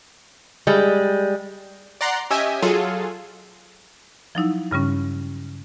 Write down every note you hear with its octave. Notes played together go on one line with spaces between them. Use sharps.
G3 G#3
D5 F#5 A#5 C6
C#4 G4 D#5 E5 G#5
F#3 F4 G#4 A4
F3 F#3 D#4 E4
G2 C#3 G3 C#4